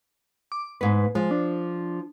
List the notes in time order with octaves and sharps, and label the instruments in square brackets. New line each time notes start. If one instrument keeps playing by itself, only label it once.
[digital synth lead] D6
[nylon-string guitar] G#2 B3 [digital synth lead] B4
[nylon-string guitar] F3 [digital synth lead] G#3
[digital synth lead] D4